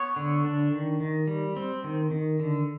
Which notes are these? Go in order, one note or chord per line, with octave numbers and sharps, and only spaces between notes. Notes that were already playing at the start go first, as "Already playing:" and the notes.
Already playing: B3 C#5
D3
D4
D#3
D#3
G3
C4
D#3
D#3
D3